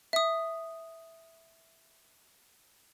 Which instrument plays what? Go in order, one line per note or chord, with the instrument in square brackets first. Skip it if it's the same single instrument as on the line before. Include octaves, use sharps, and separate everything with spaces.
[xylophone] E5 D#6